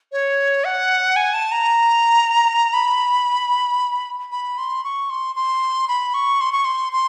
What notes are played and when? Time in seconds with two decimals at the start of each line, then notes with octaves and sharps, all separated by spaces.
0.12 C#5
0.65 F#5
1.16 G#5
1.34 A5
1.52 A#5
2.74 B5
4.31 B5
4.58 C6
4.84 C#6
5.10 C6
5.36 C6
5.88 B5
6.14 C#6
6.41 C6
6.52 C#6
6.65 C6
6.93 C6